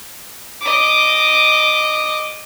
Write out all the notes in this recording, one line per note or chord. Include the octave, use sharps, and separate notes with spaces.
D#5 D6